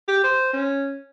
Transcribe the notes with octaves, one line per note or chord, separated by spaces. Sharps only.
G4
C5
C#4